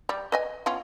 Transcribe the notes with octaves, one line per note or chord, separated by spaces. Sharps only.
G3
B4 D#5 G#5
B3 C#4 F4